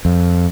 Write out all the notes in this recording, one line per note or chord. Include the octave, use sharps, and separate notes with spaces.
F2